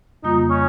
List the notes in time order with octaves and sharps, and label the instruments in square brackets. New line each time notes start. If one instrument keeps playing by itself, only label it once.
[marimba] F2 C#3 G3 A#3 F4 [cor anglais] D#4
[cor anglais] C#4